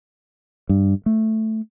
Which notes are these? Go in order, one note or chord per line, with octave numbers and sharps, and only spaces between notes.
G2
A3